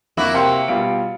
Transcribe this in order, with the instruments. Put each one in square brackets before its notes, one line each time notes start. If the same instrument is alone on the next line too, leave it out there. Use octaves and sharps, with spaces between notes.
[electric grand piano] F2 [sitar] A#3 E4 F#4
[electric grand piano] C3 A#4 C6 [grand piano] F5 G5 C#7
[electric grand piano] B2 G3 D7 [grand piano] F4 F5